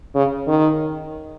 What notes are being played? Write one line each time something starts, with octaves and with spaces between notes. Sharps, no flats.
C#3
D#3